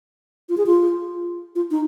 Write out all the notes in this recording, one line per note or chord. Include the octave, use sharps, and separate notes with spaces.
F4
G#4
F4
F4
D#4